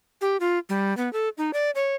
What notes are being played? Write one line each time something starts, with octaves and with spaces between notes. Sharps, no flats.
G4
F4
G3
B3
A4
D#4
D5
C#5